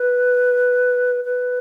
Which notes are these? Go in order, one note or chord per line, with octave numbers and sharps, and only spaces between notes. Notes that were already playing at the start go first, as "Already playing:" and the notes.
Already playing: B4
B4